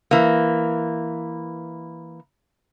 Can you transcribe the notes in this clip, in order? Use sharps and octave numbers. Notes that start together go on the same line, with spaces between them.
E3 A#3